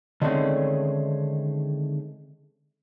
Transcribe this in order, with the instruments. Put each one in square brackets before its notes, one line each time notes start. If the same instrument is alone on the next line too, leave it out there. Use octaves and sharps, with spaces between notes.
[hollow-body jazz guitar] D3 D#3 G#3 A3 C4 C#4